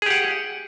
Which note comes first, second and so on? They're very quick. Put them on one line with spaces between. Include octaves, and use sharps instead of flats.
G#4 G4 F#5